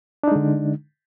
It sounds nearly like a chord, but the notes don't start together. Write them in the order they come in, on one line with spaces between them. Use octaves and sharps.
D4 D#4 G#3 D3